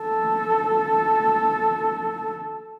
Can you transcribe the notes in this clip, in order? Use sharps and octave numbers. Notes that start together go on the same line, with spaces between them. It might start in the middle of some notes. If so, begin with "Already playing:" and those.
Already playing: A4